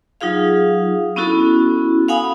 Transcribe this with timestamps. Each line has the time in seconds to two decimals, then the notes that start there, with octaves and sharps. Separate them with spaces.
0.21 F#3 D#4 F4 G#4 F5
1.16 B3 C#4 E4 F#4 A4
2.08 F5 F#5 G#5 B5 D#6